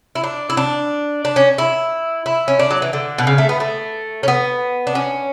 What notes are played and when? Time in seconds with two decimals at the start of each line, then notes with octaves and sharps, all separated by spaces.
0.15 E4
0.24 D4
0.50 E4
0.57 D4
1.25 D4
1.36 C#4
1.58 E4
2.26 E4
2.48 C#4
2.59 D4
2.71 F#3
2.82 E3
2.93 D3
3.18 B2
3.27 C#3
3.38 A3
3.49 B3
3.60 A3
4.23 C#4
4.28 B3
4.87 D4
4.95 C#4